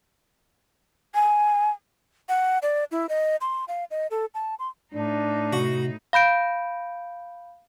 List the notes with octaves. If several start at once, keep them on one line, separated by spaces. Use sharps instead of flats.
G#5
F#5
D5
E4
D#5
C6
F5
D#5
A4
A5
C6
A2 D4 D#4
C3 F#4
F5 B5 G6 D7